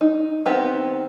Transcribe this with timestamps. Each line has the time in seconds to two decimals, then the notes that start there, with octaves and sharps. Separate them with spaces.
0.01 D#4
0.46 D#3 B3 C4 G4